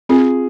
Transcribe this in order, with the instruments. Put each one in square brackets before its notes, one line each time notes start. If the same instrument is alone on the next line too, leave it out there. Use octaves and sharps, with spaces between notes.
[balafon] C4 [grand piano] F4 G#4